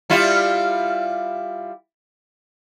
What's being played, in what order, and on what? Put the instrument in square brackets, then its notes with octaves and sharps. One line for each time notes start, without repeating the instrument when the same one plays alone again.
[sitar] G3 E4 F4